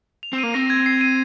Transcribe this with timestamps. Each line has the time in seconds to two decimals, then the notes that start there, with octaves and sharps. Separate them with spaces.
0.23 F7
0.33 C4
0.38 A#3 D#7
0.54 C4 A#6
0.70 G#6
0.86 C7
1.01 D#7